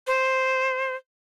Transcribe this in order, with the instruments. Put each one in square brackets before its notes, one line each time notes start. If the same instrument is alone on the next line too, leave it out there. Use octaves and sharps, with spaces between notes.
[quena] C5